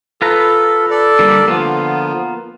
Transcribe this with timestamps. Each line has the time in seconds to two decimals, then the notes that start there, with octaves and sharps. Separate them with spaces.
0.22 F4 A4 B4 A#5
0.90 A4 D5
1.19 D3 G3 A#3
1.48 D3 F3 A#3 B3 F4